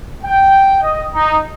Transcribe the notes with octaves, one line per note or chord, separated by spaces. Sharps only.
G5
D#5
D#4